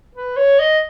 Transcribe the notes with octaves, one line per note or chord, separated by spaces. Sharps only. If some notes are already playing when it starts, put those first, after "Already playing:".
B4
C#5
D#5